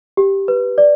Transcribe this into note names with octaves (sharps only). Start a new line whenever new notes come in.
G4
B4
D5